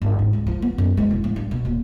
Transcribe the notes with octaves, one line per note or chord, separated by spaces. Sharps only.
G1
G#2
C#2
F3
B3
F#2
G#3
E1
A1
G2
B2
D#1